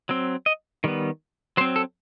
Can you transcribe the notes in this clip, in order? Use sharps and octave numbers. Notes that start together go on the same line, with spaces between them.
F#3 C4
D#5
D#3 G3 B3
F#3 C4 C5
A4